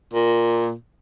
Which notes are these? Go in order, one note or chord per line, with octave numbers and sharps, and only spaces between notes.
A#2